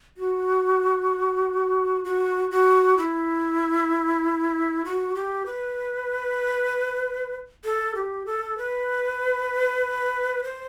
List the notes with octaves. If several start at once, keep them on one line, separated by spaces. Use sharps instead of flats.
F#4
F#4
F#4
E4
F#4
G4
B4
A4
G4
A4
B4
C5